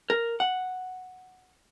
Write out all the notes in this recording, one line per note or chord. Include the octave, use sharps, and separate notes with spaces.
A#4
F#5